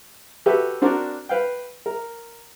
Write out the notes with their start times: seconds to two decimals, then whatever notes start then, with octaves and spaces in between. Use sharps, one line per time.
0.46 F#4 G4 A4 B4 E5
0.82 C4 D4 F#4 A#4 D5
1.29 B4 F5 G5
1.86 A#4